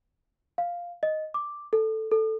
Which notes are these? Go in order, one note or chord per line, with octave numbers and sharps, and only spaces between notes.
F5
D#5
D6
A4
A4